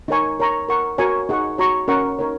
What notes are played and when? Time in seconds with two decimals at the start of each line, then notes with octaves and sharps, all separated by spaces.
0.08 D#4 A#4 C#5 G#5 C#6
0.39 A#4 C#5 A#5 C#6
0.69 A#4 F#5 C#6
0.98 F#4 A#4 C#5 G#5 C#6
1.29 D#4 G#4 F#5 C#6
1.58 F#4 C#5 A#5 C#6
1.88 C#4 A#4 F#5 C#6
2.19 D#4 A#4 C#5